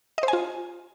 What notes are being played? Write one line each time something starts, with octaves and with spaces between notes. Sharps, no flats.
D#5
C5
G#5
F4